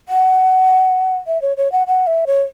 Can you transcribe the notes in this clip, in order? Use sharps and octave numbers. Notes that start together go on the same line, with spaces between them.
F#5
E5
C#5
C#5
F#5
F#5
E5
C#5